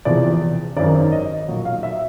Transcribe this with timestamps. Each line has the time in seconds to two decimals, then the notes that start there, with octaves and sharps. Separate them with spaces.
0.05 E1 E2 C3 F3 D5
0.77 G#1 F#2 D#3 D5
1.12 D#5
1.47 B1 A#2 F#3
1.65 F5
1.83 E5